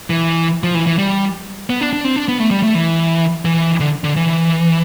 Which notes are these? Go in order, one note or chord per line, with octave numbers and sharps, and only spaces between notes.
E3
F3
E3
E3
G3
B3
D4
D4
C4
D4
B3
A3
G3
A3
E3
E3
D3
D3
E3